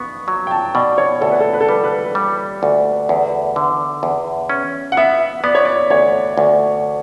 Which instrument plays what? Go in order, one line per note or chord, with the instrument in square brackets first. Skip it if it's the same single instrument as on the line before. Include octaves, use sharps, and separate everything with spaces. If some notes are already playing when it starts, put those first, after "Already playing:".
Already playing: [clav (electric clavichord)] B3 [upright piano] C#6
[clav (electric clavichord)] F#3
[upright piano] G5
A5
[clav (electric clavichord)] B2 [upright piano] D5
[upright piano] C#5
[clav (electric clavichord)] D2 [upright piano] A4
[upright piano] B4
A4
B4
A4
[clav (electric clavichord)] G3 [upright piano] B4
[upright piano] B4
[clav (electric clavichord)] G3
D2
E2
D3
E2
C#4
[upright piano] F#5
[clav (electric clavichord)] B3 [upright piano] E5
[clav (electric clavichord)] B3 [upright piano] D5
[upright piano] C#5
D5
[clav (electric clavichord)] D2 [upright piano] C#5
[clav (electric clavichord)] D2